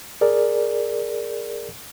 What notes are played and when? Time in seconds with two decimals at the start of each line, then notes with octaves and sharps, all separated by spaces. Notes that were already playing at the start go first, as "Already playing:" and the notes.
0.21 G#4 A#4 D5